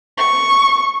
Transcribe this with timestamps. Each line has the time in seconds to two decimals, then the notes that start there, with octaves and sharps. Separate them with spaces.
0.18 C#6